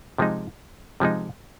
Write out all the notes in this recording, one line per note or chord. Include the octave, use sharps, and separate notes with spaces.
C3 F3 G#3 D#4
C3 F3 G#3 D#4